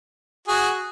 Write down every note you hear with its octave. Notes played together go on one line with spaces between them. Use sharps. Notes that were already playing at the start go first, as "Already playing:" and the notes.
F#4 G#4